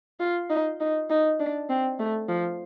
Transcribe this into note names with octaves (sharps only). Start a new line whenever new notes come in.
F4
D#4
D#4
D#4
D4
C4
A3
F3